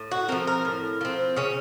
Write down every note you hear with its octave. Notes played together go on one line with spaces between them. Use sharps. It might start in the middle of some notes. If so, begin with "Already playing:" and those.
Already playing: A2
F#4
F3 C4 A#4
A#4
A2
F3 C4
C#3 C#4